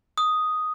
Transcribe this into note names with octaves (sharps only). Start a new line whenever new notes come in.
D#6